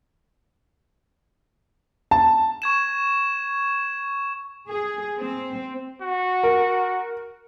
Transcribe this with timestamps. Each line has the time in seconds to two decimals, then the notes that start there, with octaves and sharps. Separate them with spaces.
2.11 A5
2.62 C#6 G#6 E7
4.68 G#4
5.19 C4
6.02 F#4
6.44 A#4